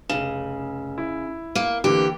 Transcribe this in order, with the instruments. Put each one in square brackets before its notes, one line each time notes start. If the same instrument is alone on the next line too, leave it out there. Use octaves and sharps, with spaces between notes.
[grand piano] F1 E7 [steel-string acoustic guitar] C#3
[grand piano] E4
[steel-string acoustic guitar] A#3
[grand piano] D3 E3 A#3 [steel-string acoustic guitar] G4